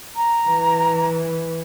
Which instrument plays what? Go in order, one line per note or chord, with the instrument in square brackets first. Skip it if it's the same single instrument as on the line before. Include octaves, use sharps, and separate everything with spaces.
[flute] A#5
[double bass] E3